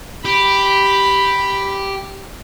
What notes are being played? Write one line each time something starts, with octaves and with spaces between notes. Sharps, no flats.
G4 B5